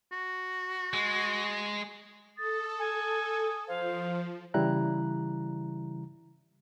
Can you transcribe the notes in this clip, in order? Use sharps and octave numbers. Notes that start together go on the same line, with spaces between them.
F#4
G#3
A4 D#6 A6
G#5
F3 C5 F5
C#3 E3 G3 E4 A#5 F#6